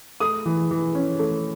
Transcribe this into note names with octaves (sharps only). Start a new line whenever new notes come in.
A3 D#6
E3
E3
C#4
A3